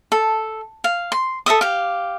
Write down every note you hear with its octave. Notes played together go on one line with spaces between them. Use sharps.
A4
F5
C6
A4 C5 E5 D#6
G4 F5